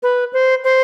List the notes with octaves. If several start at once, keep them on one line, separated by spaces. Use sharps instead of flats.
B4
C5
C5